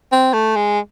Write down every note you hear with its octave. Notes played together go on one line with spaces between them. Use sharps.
C4
A3
G#3